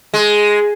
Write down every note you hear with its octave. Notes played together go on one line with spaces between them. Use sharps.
G#3